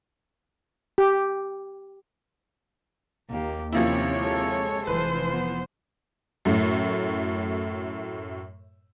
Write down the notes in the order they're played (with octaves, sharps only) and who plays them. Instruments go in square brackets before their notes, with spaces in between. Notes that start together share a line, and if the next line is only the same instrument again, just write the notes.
[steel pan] G4
[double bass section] D#2 [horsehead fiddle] A#3 G4
[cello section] C3 C#5 [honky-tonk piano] F3 A#3 E4 [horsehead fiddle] C#4
[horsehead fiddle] G#3 A4
[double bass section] F1 E3 F3 [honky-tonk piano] B4 [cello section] C5
[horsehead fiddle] B3
[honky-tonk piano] F#2 A2